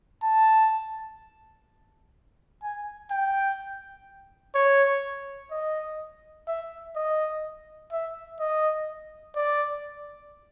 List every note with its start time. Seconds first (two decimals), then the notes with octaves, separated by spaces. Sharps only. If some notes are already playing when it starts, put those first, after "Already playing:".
0.23 A5
2.63 G#5
3.11 G5
4.55 C#5
5.51 D#5
6.48 E5
6.96 D#5
7.92 E5
8.40 D#5
9.36 D5